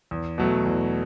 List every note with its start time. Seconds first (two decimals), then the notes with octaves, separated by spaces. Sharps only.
0.11 E2
0.38 B2 F#3 A3
0.65 E2